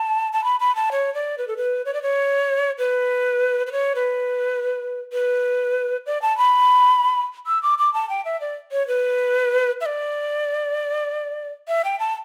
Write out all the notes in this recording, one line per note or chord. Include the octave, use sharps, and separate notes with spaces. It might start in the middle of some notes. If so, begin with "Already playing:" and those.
Already playing: A5
A5
B5
B5
A5
C#5
D5
B4
A4
B4
C#5
D5
C#5
B4
B4
C#5
B4
B4
D5
A5
B5
E6
D6
D6
A5
G5
E5
D5
C#5
B4
E5
D5
E5
G5
A5